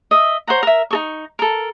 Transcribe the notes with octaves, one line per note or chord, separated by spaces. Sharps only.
D#5 E5
C5 C#5 F#5 A#5
A#4 E5
D#4 A4 C#6
A4 A#4